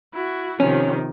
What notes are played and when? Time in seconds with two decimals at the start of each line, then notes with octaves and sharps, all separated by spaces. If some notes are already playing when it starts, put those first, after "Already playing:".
0.13 E4 F#4
0.60 C3 D#3 F3 C#4